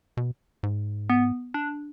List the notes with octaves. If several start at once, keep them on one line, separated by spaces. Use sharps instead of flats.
B2
G#2
B3
D4